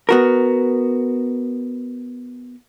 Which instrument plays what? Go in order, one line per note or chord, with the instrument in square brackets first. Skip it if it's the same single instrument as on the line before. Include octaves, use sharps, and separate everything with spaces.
[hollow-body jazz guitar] B3 F#4 A#4